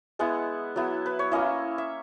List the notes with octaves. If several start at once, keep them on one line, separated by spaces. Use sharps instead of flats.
G#3 B3 E4 F#5
F#3 B3 E4
B4
C#5
A#3 C#4 E4 D#5
E5